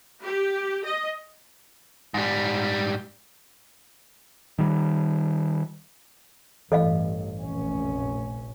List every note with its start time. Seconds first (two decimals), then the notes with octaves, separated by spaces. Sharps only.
0.23 G4
0.85 D#5
2.14 G#2 G3
4.59 D#3 G3
6.72 A1 G2 E3 A4 D#5 F5
7.40 F1 A#1 C#4